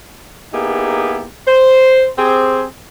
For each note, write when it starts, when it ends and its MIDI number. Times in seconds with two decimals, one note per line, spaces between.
0.53 1.27 58
0.53 1.27 59
0.53 1.27 63
0.53 1.27 64
0.53 1.27 67
0.53 1.27 68
1.47 2.06 72
2.18 2.64 60
2.18 2.64 67
2.18 2.64 68